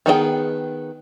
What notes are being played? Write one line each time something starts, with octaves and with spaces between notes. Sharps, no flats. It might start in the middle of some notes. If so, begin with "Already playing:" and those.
D#3 B3 D4 G#4 G5